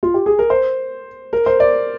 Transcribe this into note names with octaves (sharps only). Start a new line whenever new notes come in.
F4
G4
G#4
A#4
C5
A#4
C5
D5